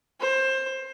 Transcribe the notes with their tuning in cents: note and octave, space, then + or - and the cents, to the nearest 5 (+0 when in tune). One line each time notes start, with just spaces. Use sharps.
C5 +20